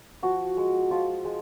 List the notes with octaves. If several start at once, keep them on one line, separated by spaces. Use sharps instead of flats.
F3 F#4
G#3
F3 F4
G#3